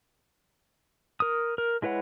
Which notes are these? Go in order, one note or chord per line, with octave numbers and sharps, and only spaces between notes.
A#4 D#6
A#4
G#3 E4 B4 C#5 F#5